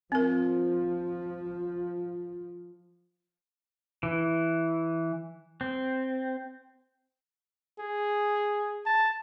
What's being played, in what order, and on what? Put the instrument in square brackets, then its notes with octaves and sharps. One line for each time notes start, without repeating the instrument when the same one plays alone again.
[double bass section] F3 [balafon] C4 A#4
[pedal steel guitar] E3
C4
[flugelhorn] G#4
A5